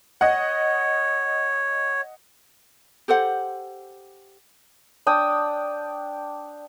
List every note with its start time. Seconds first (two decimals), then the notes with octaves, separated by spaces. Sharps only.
0.21 C#5 D#5 F#5
3.08 G4 A4 C5 F#5
5.07 D4 G5 D#6